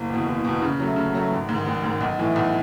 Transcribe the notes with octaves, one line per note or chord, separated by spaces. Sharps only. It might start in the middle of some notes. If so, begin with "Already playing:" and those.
Already playing: F#1
E2 B2
F#1
E2 B2
C#3
F#3 A3
C#3
F#3 A3
G#1
G#2 D#3
G#1
G#2 D#3
B1
A2 E3
B1